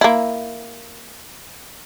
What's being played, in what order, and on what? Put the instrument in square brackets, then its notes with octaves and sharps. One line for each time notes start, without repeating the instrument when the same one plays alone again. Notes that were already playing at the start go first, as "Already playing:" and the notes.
[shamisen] A#3 E4